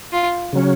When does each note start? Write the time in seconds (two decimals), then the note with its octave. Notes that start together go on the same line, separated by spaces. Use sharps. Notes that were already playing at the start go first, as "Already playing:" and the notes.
0.12 F4
0.53 C#3 F#3 C#4